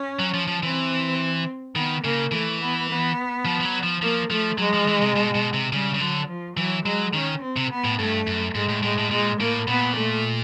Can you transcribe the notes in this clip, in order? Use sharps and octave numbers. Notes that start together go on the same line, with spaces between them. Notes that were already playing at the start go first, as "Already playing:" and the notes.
Already playing: C#4
F#3
F3
F3
E3 C4
D#3 B3
C#3 A#3
E3 A3
B3
B3
F3
F3
F#3
F3
F3 A#3
F3 A3
F#3 G#3
F3
E3
C3
B2
B2
C3
C#3 G3
C#3
D3 F#3
F3
E3 F#3
F#3 G#3
D#3 C#4
C4
C3
B3
A2
G2 A3
F#2
G#2 G#3
A2
A2 G#3
A2
A#2 G#3
A2 A#3
A#2 B3
A3